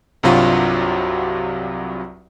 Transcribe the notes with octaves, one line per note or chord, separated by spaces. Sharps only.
C2 G2 C3 F#3 F4 F#4